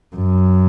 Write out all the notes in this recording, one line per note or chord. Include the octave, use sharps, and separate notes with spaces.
F#2